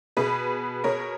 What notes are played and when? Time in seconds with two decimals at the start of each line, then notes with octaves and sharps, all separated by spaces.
0.17 B2 G#4 B4
0.84 B2 A#4 C#5